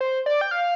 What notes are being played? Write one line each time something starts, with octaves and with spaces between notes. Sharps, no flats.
C5
D5
G5
F5